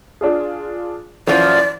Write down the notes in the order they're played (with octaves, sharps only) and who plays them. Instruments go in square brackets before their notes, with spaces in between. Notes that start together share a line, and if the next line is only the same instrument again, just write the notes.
[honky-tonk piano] D4 F4 G#4
[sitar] F#2 C#3 F3 [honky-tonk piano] E3 [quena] D5